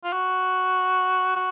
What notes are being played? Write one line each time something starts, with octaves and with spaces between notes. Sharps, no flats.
F4
F#4
F#4